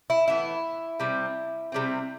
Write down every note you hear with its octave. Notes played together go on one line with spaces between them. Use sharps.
E4
A2 E3 B3 E4
C3 G3 C4
C3 G3 C4